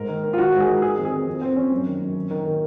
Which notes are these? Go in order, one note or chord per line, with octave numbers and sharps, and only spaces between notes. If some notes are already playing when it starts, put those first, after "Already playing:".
Already playing: G#2 A#4
D#3
D#3
F4
D#3 F#4
G#2
G#4
D#3
D#3 G#4
F2
G#4
D#3
F2
F2 C4
F2 C#4
F#2
D#3
F#2
D#3
D#3
D#3